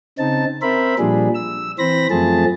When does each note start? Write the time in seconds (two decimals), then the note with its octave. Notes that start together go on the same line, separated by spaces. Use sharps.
0.19 C#3 C4 D#4 A5
0.62 C4 A#4 C5 E5 B5
0.99 A#2 F3 G3 D4 G#4
1.35 E6
1.79 E3 C4 C5 B5 A#6
2.11 F#2 F3 A3 C4 G#4 A5